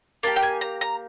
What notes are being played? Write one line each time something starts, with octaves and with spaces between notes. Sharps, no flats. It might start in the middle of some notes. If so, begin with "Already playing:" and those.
A#3 D4 G4 A5
G5
G#5
A#5
A#5